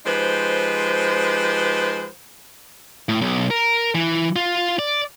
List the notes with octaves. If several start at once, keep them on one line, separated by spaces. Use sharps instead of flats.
F3 G#3 D#4 G4 B4 C5
A2
B1
A#4
E3
F4
D5